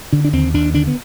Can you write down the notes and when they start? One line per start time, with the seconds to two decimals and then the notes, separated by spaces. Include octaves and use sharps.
0.12 D3 D4
0.24 D4
0.33 D#2 C4
0.54 D#2 D4
0.74 D3 D4
0.87 B3